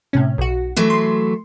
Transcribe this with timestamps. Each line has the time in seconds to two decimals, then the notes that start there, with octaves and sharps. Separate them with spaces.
0.13 A2 C3 C#4
0.38 B1 F#4
0.76 E3 F#3 A3
0.90 C6